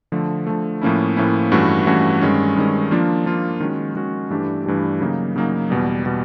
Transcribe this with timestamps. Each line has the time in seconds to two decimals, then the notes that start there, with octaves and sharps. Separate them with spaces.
0.12 D3 F3 A3
0.47 D3 F3 A3
0.81 A2 F3 A#3 C#4 E4
1.17 A2 F3 A#3 C#4 E4
1.52 G2 E3 A3 C#4 F#4
1.86 G2 E3 A3 C#4 F#4
2.21 G2 D#3 G#3 C#4
2.56 G2 D#3 G#3 C#4
2.91 F3 A#3 D4 F4
3.26 F3 A#3 D4 F4
3.60 D#3 G#3 C#4 F#4
3.96 D#3 G#3 C#4 F#4
4.30 G2 E3 A3 D4 G4
4.66 G2 E3 A3 D4 G4
5.00 C#3 F#3 A#3 D#4
5.36 C#3 F#3 A#3 D#4
5.70 E2 B2 G3
6.05 B2 G3